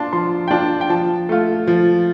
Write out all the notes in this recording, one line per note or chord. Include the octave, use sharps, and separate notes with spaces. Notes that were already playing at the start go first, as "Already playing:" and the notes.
Already playing: D4 F4 A5 C6
F3 C6
G5
D4 F4 A5
G5
F3 A5
A3 F4
F3